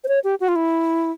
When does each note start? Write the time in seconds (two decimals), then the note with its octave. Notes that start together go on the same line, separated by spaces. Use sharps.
0.04 C5
0.08 C#5
0.24 G4
0.40 F#4
0.48 F4
0.56 E4